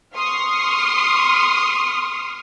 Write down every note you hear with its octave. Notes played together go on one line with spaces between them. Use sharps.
C6 C#6 D#6 F6